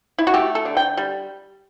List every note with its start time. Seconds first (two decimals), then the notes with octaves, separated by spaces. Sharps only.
0.18 E4
0.27 F#4
0.34 A3 G4
0.55 A4
0.65 D3
0.77 G5
0.97 G3